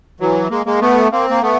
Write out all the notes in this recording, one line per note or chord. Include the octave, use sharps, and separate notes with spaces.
E3 F#3
G#3 A#3
G#3 A#3
A3 B3
A#3 C4
A#3
A3 B3